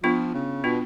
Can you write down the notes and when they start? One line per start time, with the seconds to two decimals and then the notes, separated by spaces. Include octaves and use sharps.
0.03 F3 B3 D4 F4
0.34 C#3
0.64 B2 B3 D4 F4